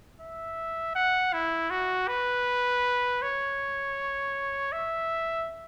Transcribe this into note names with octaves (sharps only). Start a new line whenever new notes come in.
E5
F#5
E4
F#4
B4
C#5
E5